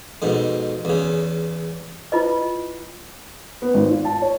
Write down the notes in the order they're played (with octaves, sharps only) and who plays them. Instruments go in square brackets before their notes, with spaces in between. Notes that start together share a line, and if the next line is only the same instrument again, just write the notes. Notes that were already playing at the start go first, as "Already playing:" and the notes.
[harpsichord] F2 G#2 B2
E2 C#3
[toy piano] E4 F4 B4 D#5
[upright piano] B3
G#1
F4
A5
C#5